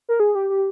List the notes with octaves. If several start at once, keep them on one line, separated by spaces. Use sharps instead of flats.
A#4
G#4
G4
G4